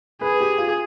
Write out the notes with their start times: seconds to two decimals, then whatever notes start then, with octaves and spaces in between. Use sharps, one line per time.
0.21 G#4 B4
0.41 G4
0.58 F4